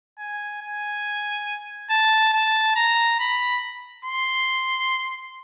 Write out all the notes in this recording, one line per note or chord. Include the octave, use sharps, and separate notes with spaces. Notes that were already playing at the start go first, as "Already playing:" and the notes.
G#5
G#5
A5
A5
A#5
B5
C6